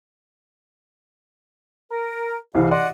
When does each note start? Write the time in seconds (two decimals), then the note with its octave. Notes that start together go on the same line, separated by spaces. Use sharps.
1.91 A#4
2.55 C2 F2 C#3 E3 F5
2.71 F#4 D5 D#5 F#5 C6